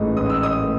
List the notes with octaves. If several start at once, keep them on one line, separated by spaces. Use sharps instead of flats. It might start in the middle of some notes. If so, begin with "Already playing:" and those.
Already playing: A1 G#2 E3 A3 D#5
A1 D#6
E6
D#5 D#6
A3